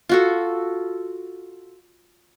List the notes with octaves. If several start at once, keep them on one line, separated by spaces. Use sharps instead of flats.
F4 F#4 A4